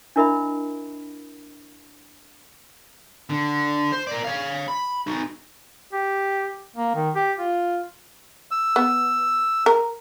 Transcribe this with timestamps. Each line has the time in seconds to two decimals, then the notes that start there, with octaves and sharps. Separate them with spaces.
0.16 D4 E4 A#4 D#5 E5 B5
3.30 D3
3.92 C5
4.07 A#4 D5
4.24 C#5 F5
4.68 B5
5.07 D#4 F#4
5.93 G4
6.76 A#3
6.95 D#3
7.15 G4
7.38 F4
8.51 E6
8.76 B3
9.66 A#4